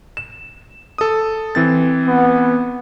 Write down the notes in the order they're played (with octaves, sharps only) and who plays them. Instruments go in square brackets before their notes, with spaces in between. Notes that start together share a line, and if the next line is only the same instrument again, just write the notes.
[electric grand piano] E7
A4 D#6
E3 C4 A6
[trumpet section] B3